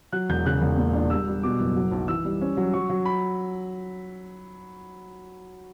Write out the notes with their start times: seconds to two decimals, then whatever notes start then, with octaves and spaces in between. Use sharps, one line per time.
0.12 F#3 F#6
0.29 E1 G6
0.45 C#3 F#6
0.61 E1
0.78 A#2
0.94 D4
1.10 G3 E6
1.28 G3
1.43 B2 D6
1.60 F#1
1.76 F#3
1.91 B1
2.08 E3 E6
2.25 G3
2.41 C#4
2.57 F#3
2.73 F#3 C#6
2.90 F#3
3.05 B5